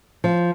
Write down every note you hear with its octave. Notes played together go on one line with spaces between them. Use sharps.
F3